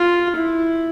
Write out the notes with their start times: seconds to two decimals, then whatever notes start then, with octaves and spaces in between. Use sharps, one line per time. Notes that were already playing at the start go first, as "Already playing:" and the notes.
Already playing: F4
0.36 E4